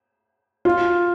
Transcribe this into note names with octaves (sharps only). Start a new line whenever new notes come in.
F4